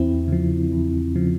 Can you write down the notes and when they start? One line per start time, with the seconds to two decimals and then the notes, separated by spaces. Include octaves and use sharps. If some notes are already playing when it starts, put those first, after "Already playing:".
Already playing: E2 C4 E4
0.28 C#3 F3
0.72 E2
1.16 C#3 F3